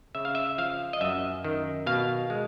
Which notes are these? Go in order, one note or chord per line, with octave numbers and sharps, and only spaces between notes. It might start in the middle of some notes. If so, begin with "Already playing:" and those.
C#3 E5
F5
E5
F3 F5
D#5
F#2 E5
D#3
B2 F5
G#3